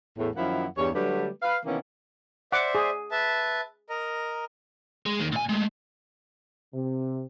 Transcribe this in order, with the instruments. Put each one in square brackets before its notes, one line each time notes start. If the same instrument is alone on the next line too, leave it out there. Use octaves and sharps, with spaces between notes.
[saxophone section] E2 A2
F#2 D#3 F3 A#3 E4 F#5
E2 G2 C#5
D3 F#3 G3 A3 G4 B4
B4 F5
C3 D#3 E3 A#3 B3 C#4
[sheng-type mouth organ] C5 D5 E5 [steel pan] F#5 D6
[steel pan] G#4
[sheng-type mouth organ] B4 E5 A5
A#4 D#5 A#5
[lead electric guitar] G#3
D#2 D#3
A#2 G#5
G#3 A3
[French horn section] C3